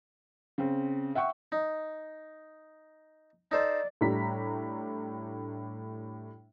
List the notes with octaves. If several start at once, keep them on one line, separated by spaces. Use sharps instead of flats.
C#3 C4
E5 F#5 G5 C#6
D#4
D#4 A4 C5 D5
A2 G3 D4 A#5 B6